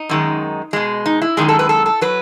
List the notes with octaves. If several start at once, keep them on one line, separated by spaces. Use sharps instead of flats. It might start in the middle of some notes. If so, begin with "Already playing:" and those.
Already playing: D#4
F#2 D#3 G#3
B2 G#3
D#4
E4
F#2 D#3 G#3 G#4
A4
B4
A4
A4
F#3 B4